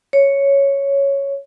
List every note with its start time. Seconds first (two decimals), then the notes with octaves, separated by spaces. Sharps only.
0.13 C#5